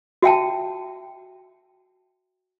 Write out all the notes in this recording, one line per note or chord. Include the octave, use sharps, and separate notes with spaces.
F#4 E5 G5 A5